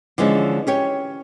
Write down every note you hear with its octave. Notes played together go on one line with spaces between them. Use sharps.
D3 E3 F3 G#3 C#4
C#4 G4 C#5